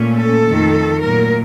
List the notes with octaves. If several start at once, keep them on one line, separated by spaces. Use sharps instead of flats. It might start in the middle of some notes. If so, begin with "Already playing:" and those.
Already playing: A#2 A3 C#4
A4
F2 D#3 A3
A#2 F#3 A3 A#4